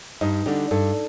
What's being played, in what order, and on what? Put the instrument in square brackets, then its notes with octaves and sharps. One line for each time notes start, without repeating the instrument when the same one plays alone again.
[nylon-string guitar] G2 [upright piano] D#4
[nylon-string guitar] D3 G3 [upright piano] D4
[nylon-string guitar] G2 [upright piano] A4